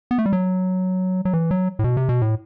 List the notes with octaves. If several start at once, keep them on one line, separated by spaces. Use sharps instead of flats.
B3
A3
G3
F#3
F#3
E3
F#3
A2
B2
C3
B2
A2